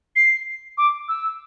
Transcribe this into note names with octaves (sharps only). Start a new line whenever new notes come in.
C7
D6
E6